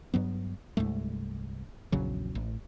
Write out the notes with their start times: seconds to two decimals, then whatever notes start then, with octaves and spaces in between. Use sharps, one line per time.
0.14 G2 F#3 B3
0.77 C2 G2 G#3 A3
1.92 A#1 E2 C#3 F#3
2.35 A1